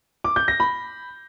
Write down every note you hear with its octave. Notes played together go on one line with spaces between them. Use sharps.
D6
G6
A#6
B5